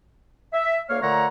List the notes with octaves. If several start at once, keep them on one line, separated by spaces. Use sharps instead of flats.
E5
D2 A#3 C#5 F5
A#2 D3 A3 C#5 F#5 A#5